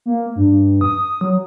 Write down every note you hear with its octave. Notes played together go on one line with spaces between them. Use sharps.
A#3
G2
D#6
F#3